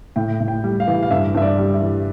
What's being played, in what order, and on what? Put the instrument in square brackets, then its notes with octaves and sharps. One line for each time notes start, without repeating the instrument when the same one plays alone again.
[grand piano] A2 G5
A2
G5
G3
F5
E3
F5
G2 E5
G2 E5
D5
G3
E5
E3